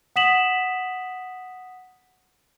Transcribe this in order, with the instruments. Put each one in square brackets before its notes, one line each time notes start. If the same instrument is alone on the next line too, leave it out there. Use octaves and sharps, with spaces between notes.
[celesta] F#5 D#6 B6 E7 F#7